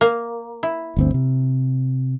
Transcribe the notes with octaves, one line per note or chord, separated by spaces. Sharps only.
A#3
E4
G1 D2 C4
C3